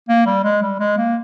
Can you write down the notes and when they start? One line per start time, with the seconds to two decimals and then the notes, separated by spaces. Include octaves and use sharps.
0.09 A#3
0.26 G3
0.44 G#3
0.62 G3
0.80 G#3
0.97 A#3